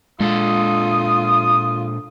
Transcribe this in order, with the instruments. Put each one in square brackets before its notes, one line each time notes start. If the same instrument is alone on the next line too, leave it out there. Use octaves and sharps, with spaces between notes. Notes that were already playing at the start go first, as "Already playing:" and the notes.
[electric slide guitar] A#2 D4 A4 [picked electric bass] G#3 [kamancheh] F4 [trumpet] D#6